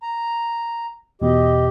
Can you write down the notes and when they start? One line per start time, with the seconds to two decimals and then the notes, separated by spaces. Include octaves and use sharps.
0.02 A#5
1.21 E2 B2 G4 D#5